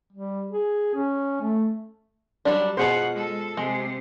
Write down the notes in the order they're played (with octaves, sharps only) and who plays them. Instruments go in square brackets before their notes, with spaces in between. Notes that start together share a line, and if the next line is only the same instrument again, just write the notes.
[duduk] G3
G#4
C#4
A3
[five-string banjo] F#3 G3 D4
[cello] B2 F#5 [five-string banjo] F4 G#4 C5
[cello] G#3 A4
[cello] C3 [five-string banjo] G#3